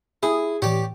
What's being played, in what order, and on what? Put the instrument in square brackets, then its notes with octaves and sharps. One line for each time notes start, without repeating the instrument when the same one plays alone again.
[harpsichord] E4 [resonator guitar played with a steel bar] G#4
[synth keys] A2 E3 [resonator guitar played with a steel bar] G4 [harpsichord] C#5 D5